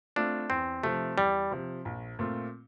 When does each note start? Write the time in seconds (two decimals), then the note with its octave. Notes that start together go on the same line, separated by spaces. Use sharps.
0.16 A3 C4 D4 F4
0.50 E2 C4
0.83 C3 F3 A3
1.17 E2 G3
1.51 C3 F3
1.85 A#1
2.19 A#2 A3 C4 F4